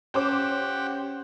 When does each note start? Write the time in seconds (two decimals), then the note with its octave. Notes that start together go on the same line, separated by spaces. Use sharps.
0.14 C#4 G4 C5 F#5 G5 D6